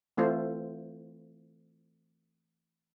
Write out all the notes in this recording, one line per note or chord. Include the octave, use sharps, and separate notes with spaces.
E3 A3 C4 F4 C5